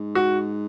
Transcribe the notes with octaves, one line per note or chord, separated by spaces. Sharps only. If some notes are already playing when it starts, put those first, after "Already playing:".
Already playing: G#2
F#4